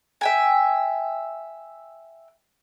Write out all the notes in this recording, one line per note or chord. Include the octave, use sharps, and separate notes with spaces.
E5 G5 G#5